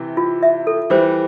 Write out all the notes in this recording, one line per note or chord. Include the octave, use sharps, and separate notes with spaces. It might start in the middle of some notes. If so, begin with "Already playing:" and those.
Already playing: C3 E3
F4
E5
A4
E3 G3 C5